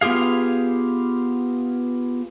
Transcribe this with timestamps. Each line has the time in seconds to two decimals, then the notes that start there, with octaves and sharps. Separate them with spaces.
0.01 B3 F4 G4 G#4 F5